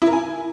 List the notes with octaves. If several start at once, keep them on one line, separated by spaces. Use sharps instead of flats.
E4
A#4
G#5